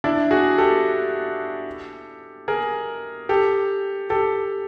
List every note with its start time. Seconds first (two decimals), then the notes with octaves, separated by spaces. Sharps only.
0.04 D4 E4
0.31 F#4 G#4
0.58 G4 A4
2.48 G#4 A#4
3.29 G4 A4
4.10 G4 A4